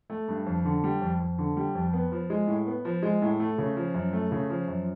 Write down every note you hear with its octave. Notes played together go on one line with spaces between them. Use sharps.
A3
G2
F2
D3
G3
F2
F2
D3
G3
F2
B3
F3
G#3
A2
B3
F3
G#3
A2
A3
C#3
F3
F#2
A3
C#3
F3
F#2